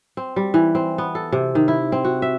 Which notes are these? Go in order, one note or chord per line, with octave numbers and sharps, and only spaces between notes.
C4
G3
E3
C4
B3
A4
C3
D#3
E4
C4
F#4
E5